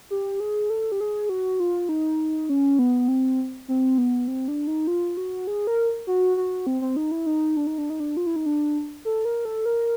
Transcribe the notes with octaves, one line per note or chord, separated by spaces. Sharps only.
G4
G#4
A4
G4
G#4
F#4
F4
D#4
C#4
B3
C4
C4
B3
C4
D4
D#4
F4
F#4
G#4
A#4
F#4
F#4
C4
C4
D#4
E4
D#4
D4
D#4
D4
D#4
D4
F4
E4
D#4
D4
A4
A#4
A4
A#4